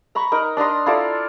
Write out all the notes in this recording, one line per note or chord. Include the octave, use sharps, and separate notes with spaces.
A#5 B5 C#6
D#4 A#4
D4 D#5 A#5 C6
E4 F4 A4 D5